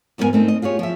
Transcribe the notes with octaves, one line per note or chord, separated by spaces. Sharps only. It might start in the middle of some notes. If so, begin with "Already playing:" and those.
F2 G#2 B3 A4 A#4 G#5
A3 C4 D#4
D#5
F4 G4 G#4 C#5
F3 E5